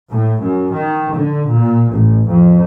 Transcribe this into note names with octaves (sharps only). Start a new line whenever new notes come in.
A2
F#2
D#3
D3
A#2
A1
F2